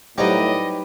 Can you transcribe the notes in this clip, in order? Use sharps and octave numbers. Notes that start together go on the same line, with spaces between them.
A2 F#3 G3 C4 D#4 G4 B4 D#5